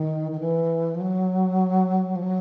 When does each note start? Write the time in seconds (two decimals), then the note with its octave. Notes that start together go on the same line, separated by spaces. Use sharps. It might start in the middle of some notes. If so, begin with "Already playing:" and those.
Already playing: D#3
0.32 D#3
0.40 E3
0.95 F3
1.01 F#3
2.16 F3
2.23 F#3